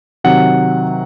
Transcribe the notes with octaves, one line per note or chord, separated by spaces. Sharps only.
C3 D#3 F#3 F#5